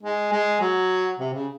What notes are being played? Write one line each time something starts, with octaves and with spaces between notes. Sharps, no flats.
G#3
G#3
F#3
C3
C#3